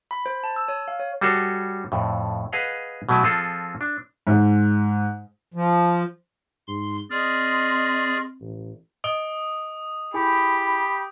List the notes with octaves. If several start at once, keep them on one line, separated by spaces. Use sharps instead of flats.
B5
C5
A5
E6
C#5
F5
C#5
G3 F#4 G#4 A4 C#5
F2 A2
G#4 B4 D#5 F5 F#5
B2 F#3 A3 E4 G#5 A5
F3 C4 F4 G#4 A4
D4
G#2 G#3
F3
G#2 C6
C4 G#4 D5 D#5 C6 F6
A1
D#5 D#6 D7 G7
E4 G4 G#4 G#5 B5